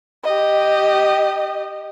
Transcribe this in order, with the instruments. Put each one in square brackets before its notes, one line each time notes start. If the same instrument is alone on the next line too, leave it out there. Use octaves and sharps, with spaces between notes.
[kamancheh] G4 D#5